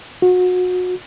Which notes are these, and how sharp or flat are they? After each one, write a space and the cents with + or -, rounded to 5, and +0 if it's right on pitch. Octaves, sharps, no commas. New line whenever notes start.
F#4 -30